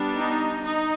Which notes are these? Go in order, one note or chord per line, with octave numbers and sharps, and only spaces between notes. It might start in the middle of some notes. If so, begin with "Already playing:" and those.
Already playing: G3 B3 D4
D#4
D#4